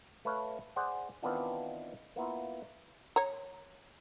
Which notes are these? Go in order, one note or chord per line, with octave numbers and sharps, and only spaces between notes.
A3 B4 C#5 F5
G#4 C5 D5 F#5
D#3 E3 B3 C4 D4 F4
A#3 B3 E4 F4
C#5 A#5